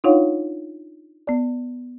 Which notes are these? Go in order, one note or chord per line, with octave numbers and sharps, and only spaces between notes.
D4 D#4 F4 C#5 F5 F#5
B3 D5